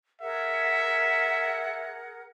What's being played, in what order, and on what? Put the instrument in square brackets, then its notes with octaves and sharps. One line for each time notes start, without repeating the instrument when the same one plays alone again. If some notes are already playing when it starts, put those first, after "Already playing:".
[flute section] G#4 A#4 F#5 [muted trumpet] E5